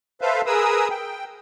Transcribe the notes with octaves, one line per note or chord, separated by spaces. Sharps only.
A4 B4 C5 E5 F5
G#4 A#4 B4 D#6 E6
G5